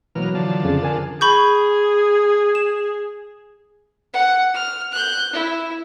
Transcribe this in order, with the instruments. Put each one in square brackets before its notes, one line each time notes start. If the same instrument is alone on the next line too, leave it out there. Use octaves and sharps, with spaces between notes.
[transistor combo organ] B2 A#3 F6 [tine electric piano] E3 F#3
[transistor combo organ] D3 F3 A5
[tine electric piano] F2 C#3
A#4 G#5
[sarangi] G#4 [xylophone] B5 C#6 G6
[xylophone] E7
[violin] F#5
F6
F#6 G6
E4